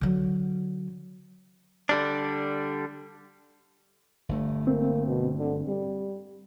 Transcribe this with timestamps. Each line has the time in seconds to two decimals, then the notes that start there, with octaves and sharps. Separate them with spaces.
0.01 D3 F#3
1.89 D3 G3 D4
4.29 G1 G2 A3
4.67 A#3 C4
5.07 B2
5.39 D3
5.68 G3